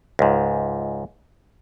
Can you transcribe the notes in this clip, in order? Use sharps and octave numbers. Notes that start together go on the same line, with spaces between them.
C#2 G#2